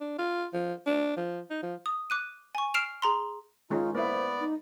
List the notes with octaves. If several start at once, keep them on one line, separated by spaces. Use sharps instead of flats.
D4
F4
F3
D4
F3
D#4
F3
D#6
D6 F#6 D#7
G#5 C#6
F6 C7 D7 E7 F7
G#4 A#5 C6
D#3 G#3 C#4 D#4 F4
A#3 B3 E4 C5 D5
D#4